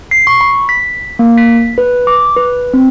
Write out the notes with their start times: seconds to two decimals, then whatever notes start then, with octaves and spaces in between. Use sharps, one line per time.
0.11 C7
0.27 C#6
0.41 B5
0.69 B6
1.19 A#3
1.38 B6
1.78 B4
2.07 D6
2.36 B4
2.74 C4